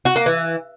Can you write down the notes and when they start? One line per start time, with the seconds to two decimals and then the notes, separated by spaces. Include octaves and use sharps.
0.05 F#4
0.16 A#3
0.26 E3